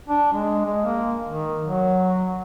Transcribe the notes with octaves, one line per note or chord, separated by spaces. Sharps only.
D4
G#3
G#3
A#3
D#3
F#3